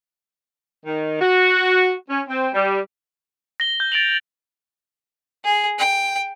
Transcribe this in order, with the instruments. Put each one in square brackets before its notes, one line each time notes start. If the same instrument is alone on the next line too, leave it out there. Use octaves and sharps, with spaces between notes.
[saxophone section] D#3
F#4
C#4
C4
G3
[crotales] A#6 G7
G6
A6 D7 F7 F#7
[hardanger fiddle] G#4
G5